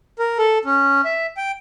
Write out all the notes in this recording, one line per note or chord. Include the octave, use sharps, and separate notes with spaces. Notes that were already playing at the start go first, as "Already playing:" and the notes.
A#4
A4
C#4
E5
G5